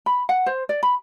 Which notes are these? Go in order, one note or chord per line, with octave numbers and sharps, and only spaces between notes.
B5
F#5
C5
D5
B5